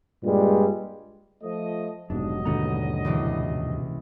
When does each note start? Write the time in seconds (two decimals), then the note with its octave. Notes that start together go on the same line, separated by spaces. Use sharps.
0.23 G2 A#2 G3 G#3
1.43 F3 A3 D#5
2.10 F1 G#2 B2 F#3 G3 D4 D#5
2.45 D#2 G#2 B2 D3 F#5 A#5
3.05 C#2 C3 E3